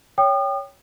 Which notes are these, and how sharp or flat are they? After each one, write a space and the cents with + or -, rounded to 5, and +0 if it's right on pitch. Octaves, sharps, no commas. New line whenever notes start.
C#5 +10 G5 +0 D#6 -40